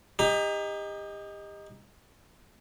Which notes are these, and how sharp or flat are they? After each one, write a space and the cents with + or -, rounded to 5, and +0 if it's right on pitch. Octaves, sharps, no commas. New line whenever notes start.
D#4 +0 G4 +35